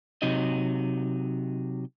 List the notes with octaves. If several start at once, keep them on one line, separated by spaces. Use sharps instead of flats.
C3 F#3 D#4 D#5